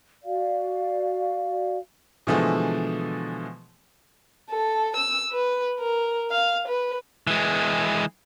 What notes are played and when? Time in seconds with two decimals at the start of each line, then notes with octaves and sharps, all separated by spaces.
0.24 F#4 D5 F5
2.27 B2 D3 E3 F3 G#3 A3
4.51 A4
4.96 E6
5.32 B4
5.79 A#4
6.30 F5
6.67 B4
7.27 E3 G#3